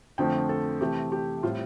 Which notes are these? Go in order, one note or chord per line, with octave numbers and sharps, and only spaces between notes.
F2 D3 F3 A3 G5
A4
C3 E3 A3 G4
G4
A2 G3 C4 F4